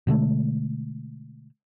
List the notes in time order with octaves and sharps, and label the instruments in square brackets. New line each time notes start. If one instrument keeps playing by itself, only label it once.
[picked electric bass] B2 D3 G#3 A3